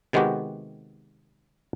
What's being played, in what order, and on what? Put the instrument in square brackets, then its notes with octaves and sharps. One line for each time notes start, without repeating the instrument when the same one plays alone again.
[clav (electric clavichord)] C3 D#3 G#3 B3 F#4 G4